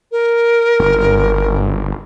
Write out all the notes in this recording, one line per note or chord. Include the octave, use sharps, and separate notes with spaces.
A#4
G1